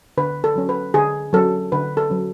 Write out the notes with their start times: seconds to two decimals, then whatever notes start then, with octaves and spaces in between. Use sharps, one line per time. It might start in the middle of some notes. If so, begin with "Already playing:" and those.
0.17 D3 B4
0.44 A4
0.56 F#3 C#4
0.69 B4
0.94 D3 G#4
1.33 F#3 C#4 A4
1.72 D3 B4
1.97 A4
2.10 F#3 C#4